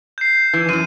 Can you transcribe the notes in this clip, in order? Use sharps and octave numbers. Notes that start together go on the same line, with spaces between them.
G6 C7
E3
F#2 E3 D#7